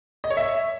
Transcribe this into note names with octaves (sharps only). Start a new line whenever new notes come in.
D#5
C#5
E5